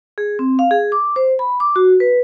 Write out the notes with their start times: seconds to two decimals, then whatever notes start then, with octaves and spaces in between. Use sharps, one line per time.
0.18 G#4
0.39 C4
0.59 F5
0.71 G#4
0.92 D6
1.16 C5
1.39 B5
1.60 D6
1.76 F#4
2.00 B4